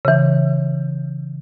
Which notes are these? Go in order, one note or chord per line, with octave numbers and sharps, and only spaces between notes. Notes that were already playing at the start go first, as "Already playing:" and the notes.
C#3 E3